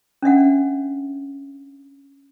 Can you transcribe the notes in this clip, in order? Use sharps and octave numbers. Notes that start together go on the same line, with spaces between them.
C#4 D4 E5 F#5